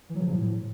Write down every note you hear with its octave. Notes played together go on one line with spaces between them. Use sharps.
E3
F#3
C#3
F3
A2